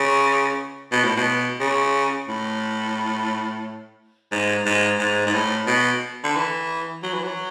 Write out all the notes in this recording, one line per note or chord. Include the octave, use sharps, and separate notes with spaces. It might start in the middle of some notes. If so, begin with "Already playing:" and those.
Already playing: C#3
B2
A2
B2
C#3
A2
G#2
G#2
G#2
G#2
A2
B2
D3
E3
F#3
E3
F#3